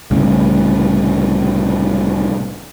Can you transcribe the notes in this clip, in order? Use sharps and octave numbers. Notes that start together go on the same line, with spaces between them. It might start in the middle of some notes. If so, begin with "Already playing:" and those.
C2 A2 C#3